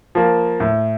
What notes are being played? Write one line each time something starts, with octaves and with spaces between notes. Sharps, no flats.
F3 A#3
A2